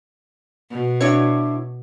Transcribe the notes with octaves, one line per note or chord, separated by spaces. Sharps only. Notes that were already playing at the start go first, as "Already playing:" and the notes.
B2
D4 E4 C#5